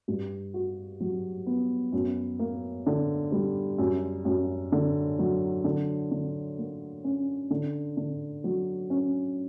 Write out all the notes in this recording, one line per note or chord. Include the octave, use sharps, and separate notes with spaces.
G2
F#4
F#3
B3
F#2
A#3
D3
G3
F#2
F#2
D3
F#3
D3
D3
A#3
C#4
D3
D3
F#3
C#4